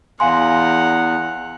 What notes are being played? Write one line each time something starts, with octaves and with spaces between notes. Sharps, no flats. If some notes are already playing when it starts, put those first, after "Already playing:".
E2 F5 F#5 G#5 A#5 C6